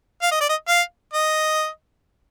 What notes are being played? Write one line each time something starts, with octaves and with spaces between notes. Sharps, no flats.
F5
D#5
D5
D#5
F5
D#5